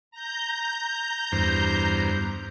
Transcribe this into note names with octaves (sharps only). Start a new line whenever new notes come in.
A#5 G6
E2 G2 C5